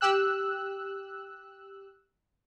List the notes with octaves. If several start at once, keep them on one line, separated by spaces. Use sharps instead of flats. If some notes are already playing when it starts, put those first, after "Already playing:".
G4 E6 F#6